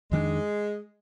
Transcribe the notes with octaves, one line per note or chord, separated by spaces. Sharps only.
F2 D#3 G#3 A#3 D4